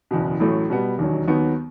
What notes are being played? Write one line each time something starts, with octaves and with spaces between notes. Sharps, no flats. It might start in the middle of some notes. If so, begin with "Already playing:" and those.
F#1 E2 B2
A1 A2 F#3 A3
B2 G3 B3
E1 D#2 D#3 F#3
D#2 D#3 F#3 B3